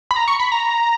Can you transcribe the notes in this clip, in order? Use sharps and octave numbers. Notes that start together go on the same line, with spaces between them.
B5
A#5
C#6
B5
A#5